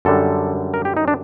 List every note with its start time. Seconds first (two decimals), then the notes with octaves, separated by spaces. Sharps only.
0.05 F#2 D3 G3 A4
0.74 A#4
0.85 G4
0.97 D#4
1.08 D4